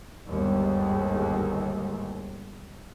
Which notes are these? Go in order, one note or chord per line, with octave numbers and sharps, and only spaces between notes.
G1 D#2 G#2